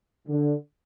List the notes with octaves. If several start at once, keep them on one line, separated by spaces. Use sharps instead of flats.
D3